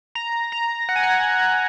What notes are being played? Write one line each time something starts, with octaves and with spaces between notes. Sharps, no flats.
A#5
A#5
F#5
G#5
F#5